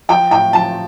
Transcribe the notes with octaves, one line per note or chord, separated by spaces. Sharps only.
F3 G5
A2 G5
F3 A5